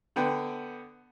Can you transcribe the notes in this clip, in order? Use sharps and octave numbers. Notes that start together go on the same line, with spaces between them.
D3 B3 G5